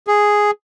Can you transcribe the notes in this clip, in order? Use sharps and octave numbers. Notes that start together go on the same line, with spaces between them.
G#4